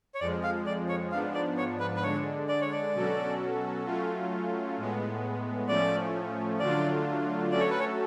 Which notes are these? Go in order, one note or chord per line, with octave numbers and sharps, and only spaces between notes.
C#5
F2 F3 G#3 D5
F5
D5
C#5
G#2 F3 B3 D4 F5
D5
C#5
B4
B4
D3 G#3 D4 C#5
D5
C#5
D5
B2 F#3 C#4 F#4 A4
F#3 A3 C#4 F4
A2 G#3 B3
A2 F3 A3 C#4 D5
D3 F#3 A3 D4 F4 D5
F#3 A3 C#4 F#4 A4 D5
C#5
B4
C#5